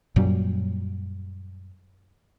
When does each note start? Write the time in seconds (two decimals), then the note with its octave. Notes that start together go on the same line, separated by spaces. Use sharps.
0.16 F#2 A#2 F#3 G3